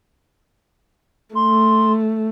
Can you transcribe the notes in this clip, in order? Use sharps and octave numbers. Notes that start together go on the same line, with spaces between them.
A3 C6